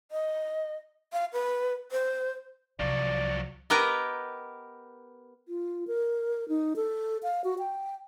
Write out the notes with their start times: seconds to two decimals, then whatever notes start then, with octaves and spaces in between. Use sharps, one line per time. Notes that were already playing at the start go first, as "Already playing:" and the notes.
0.11 D#5
1.13 F5
1.33 B4
1.92 C5
2.80 C2 F3 F#3 D5
3.70 B3 G4 A#4 B4 D#5 A#5
5.48 F4
5.87 A#4
6.49 D#4
6.76 A4
7.23 F5
7.44 F#4
7.59 G5